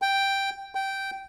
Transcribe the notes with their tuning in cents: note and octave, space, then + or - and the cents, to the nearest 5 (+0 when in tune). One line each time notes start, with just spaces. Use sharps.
G5 +0
G5 -10